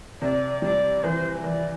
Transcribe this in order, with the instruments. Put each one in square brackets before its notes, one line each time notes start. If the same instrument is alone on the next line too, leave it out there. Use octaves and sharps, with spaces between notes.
[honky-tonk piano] C3 [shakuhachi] D5
[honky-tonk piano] G3 [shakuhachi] D5
[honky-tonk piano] E3 [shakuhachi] C5
[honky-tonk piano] E3 [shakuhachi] D5